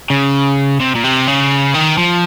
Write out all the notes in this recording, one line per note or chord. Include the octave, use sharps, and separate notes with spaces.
C#3
C3
A#2
C3
C#3
D#3
F3